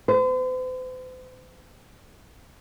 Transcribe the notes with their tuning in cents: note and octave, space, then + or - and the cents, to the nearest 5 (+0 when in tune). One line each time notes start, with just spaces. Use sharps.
C5 -45